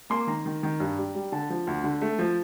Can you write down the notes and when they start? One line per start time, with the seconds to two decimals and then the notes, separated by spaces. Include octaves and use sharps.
0.10 A#3 C6
0.27 D#3 A#5
0.46 D#3
0.63 D#3
0.80 G2
0.98 G3
1.15 G3
1.32 D3 A5
1.50 F3
1.67 D2
1.84 D3
2.02 A3
2.19 F3